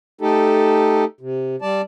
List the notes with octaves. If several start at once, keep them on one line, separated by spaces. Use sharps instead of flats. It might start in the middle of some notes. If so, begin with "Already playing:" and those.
A3 D#4 G4 A4
C3
G3 D5 A5